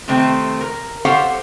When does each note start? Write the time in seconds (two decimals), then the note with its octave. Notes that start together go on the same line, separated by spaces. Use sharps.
0.08 C3 D#3 A3 C4
0.61 A#4
1.05 G4 A4 C5 C#5 F5 F#5